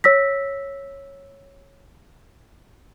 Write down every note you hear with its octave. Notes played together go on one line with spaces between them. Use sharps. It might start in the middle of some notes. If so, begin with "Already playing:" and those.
C#5 E6 A#6 B6